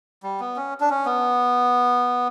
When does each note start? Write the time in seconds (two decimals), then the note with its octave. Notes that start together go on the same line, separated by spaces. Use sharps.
0.23 G3
0.40 B3
0.56 C#4
0.81 D4
0.90 C#4
1.06 B3